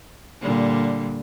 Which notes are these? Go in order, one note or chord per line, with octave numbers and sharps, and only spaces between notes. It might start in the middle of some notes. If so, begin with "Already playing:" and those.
A#2 D3 G3